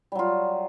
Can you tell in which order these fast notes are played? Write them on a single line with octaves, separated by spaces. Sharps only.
G3 F#3 F4